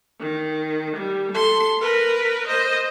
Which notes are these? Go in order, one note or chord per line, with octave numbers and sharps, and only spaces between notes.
D#3
G3
A4 C6
A#4 B4
C5 D#5